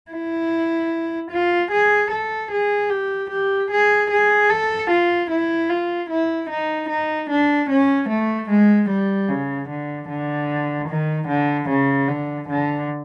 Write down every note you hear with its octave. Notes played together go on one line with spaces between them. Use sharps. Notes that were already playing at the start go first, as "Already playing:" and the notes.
E4
F4
G#4
A4
G#4
G4
G4
G#4
G#4
A4
F4
E4
F4
E4
D#4
D#4
D4
C#4
A3
G#3
G3
C#3
D3
D3
D#3
D3
C#3
D3
D3